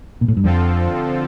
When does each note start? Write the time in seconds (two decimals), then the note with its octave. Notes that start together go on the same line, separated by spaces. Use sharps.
0.21 A#2
0.28 A2
0.37 G2
0.43 F2 D3 F3 C4 F4 A4